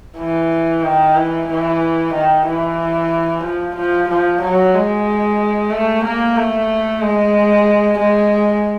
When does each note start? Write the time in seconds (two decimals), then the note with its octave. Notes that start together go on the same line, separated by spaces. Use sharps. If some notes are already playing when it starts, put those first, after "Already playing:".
0.18 E3
0.83 D#3
1.16 E3
1.48 E3
2.14 D#3
2.46 E3
3.44 F3
3.76 F3
4.09 F3
4.41 F#3
4.74 G#3
5.71 A3
6.04 A#3
6.37 A3
7.01 G#3
7.98 G#3